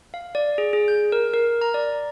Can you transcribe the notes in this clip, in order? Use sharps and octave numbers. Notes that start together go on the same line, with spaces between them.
F5
D5
G#4
G#4
G6
A#4
A#4
A#5
D5